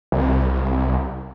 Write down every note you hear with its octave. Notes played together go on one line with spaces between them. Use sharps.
C2